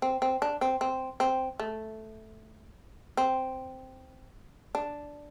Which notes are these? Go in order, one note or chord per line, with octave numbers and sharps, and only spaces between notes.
C4
C4
D4
C4
C4
C4
A3
C4
D4